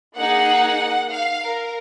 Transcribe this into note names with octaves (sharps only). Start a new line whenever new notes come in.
A#3 D#4 G#4 F#5
F5
A#4